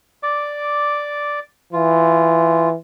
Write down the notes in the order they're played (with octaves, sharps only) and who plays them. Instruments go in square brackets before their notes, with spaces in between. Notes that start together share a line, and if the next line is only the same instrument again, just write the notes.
[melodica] D5 D6
[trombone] E3 [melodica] F4